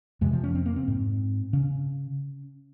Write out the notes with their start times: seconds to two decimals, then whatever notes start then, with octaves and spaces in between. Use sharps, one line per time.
0.21 F2 C3 G#3
0.33 F3
0.44 C#4
0.55 C4
0.66 A#3
0.76 C4
0.88 G#2
1.53 C#3 C#4